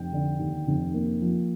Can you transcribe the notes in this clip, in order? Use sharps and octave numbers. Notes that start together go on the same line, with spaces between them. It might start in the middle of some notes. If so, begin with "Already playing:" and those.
Already playing: F1 G5
D3
D#2
F1
A#3
F3